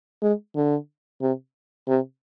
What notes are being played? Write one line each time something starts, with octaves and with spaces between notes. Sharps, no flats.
G#3
D3
C3
C3